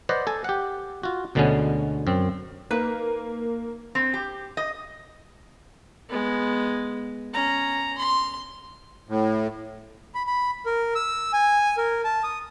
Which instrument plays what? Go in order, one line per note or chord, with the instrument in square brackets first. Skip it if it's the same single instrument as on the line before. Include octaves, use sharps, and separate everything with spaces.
[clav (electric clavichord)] B4 C5 D5 D#5 F#5
A4 G#5
G4 F#5
F4 F#4
D2 B2 D3 G#3 B3 C#4
F#2 C4
[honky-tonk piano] A#3 [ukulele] D#4 B4
[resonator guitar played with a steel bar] C4
G4
D#5
[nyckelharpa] G#3 B3
C#4 A#5
C6
[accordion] A2
[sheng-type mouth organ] B5
B5
A#4
E6
G#5
A#4
A5
D#6